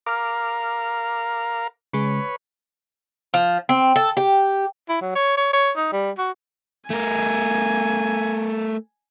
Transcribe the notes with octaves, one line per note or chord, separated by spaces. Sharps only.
A#4 F5 D6 F6
C#3 G#3 B4 C#5
F3
C4
A4
G4
E4
F#3
C#5
C#5
C#5
D#4
G3
F#4
A3 A#4 G#5